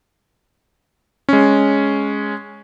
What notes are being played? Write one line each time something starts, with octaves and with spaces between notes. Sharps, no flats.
G#3 C#4